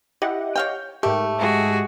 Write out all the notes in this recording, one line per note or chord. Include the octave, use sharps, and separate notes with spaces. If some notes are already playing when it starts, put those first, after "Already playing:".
E4 G4 D#5 F#5
C#5 F5 G5
G#2 A3 G4 A#4
G#3 F#4 G#4